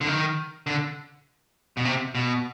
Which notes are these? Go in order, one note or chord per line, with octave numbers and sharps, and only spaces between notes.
D3
D#3
D3
B2
C3
B2